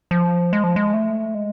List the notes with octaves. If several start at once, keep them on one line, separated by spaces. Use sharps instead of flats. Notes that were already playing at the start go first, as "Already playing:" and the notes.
F3
G#3
F3
G#3
A3
G#3